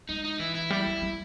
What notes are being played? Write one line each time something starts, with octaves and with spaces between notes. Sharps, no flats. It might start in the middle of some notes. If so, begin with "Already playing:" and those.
G#3 D#4
D#4
E3 E4
E4
G3
G3
G3